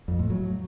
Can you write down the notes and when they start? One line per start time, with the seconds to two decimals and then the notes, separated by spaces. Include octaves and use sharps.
0.08 F2
0.19 A2
0.30 F#3